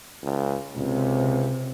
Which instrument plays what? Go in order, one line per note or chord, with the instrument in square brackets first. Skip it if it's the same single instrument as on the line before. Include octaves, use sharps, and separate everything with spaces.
[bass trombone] C#2
[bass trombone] C#2 [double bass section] C3